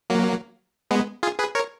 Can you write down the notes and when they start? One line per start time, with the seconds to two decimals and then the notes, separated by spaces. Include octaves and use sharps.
0.10 F#3 A#3
0.91 G#3 B3
1.23 F4 G#4
1.39 G#4 B4
1.55 A#4 C#5